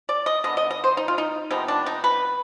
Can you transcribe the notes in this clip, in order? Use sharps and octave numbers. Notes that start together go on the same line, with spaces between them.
D5
D#5
D3 G#3 B3 D#5
D#5
D#5
C5
D#4
F4
D#4
C3 F3 G#3 B3 D#4
D4
D#4
B4